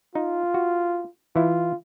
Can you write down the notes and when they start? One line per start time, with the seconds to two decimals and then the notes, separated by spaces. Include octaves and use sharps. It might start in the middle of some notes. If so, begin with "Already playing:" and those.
0.15 D#4 F4
0.54 F#4
1.36 E3 E4 F4